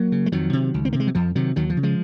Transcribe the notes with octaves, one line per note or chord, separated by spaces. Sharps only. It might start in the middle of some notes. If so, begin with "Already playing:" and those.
Already playing: F#3 A#3
C#3
G#3
F2 D#3 F#3
C3
C#2
C4
C3 A#3
G#3
F#3
F2 F3
C3 D#3 F#3
D#2 D#3 F#3
F3
C#3
F3 G#3